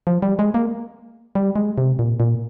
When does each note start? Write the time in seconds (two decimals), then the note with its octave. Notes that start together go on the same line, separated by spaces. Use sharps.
0.07 F3
0.22 G3
0.39 G#3
0.54 A#3
1.35 G3
1.56 G#3
1.78 C3
1.99 A#2
2.20 A#2